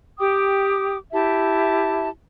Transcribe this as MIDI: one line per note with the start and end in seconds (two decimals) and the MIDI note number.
0.19 0.96 67
0.19 0.96 79
0.19 0.96 86
0.19 0.96 87
1.12 2.08 64
1.12 2.08 67
1.12 2.08 76
1.12 2.08 81